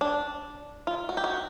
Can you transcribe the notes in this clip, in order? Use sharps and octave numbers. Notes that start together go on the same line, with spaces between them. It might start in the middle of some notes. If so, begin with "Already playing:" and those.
D4
F4
F#4
G4
F#4